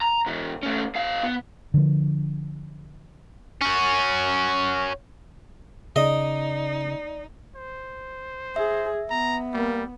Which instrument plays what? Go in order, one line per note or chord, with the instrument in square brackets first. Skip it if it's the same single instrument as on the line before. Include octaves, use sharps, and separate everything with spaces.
[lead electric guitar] A#5
B2 E3
A3 C#4
B2 F5
B3
[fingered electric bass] D3 F3
[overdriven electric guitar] C#4 F#4
[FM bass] C#3 [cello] D#4 [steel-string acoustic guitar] D5 [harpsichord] D#5
[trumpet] C5
[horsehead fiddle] G#4 [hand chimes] E5
[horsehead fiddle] B3 [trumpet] A#5
[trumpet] G3 [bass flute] A#3